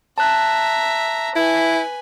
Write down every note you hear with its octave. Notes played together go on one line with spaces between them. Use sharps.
E5 A5 A#5 F#6
E4 B4 G#5